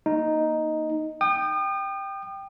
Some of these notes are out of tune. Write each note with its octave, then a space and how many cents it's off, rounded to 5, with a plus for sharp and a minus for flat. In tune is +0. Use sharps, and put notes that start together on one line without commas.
A#3 +0 D#4 +0
G5 +0 D#6 -40